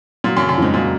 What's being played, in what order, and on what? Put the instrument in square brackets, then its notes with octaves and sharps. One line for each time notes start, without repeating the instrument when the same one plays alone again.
[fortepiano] A#2 [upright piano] F#3
[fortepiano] F#2
[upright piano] C#3
[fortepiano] F#2
[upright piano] F2 [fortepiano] G#2
[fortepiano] A#2 [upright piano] F#3